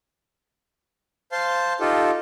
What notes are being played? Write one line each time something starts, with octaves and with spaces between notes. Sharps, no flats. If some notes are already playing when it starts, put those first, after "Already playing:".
C5 F5 A5 C6
D#4 F4 G4 A4